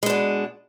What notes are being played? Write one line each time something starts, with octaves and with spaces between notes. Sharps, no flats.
B2 G#3 D4